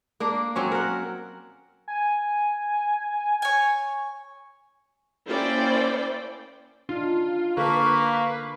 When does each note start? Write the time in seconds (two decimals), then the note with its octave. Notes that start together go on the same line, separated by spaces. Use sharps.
0.20 A#3 D4
0.56 F#3 C4 C#4
0.72 A#4 F#5
1.88 G#5
3.42 C#5 G#5
5.27 A#3 C#4 E4 C5 D5 G5
6.89 D4 D#4 F4
7.57 D3 A#3 A4 B4 F5 C#6